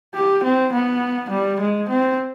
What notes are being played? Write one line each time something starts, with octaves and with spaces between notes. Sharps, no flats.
G4
C4
B3
G3
G#3
C4